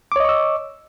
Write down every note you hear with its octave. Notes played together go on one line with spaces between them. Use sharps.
C#5 D#5 C#6 D6 E6